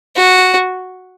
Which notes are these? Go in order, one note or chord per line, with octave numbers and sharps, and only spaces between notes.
F#4